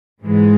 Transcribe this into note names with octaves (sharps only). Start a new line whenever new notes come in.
G#2 E3 G#3